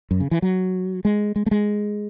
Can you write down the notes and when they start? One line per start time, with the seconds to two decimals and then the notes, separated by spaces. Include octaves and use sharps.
0.11 F#2
0.20 C#3
0.31 E3
0.42 F#3
1.05 G#3
1.36 G#3
1.46 A3
1.51 G#3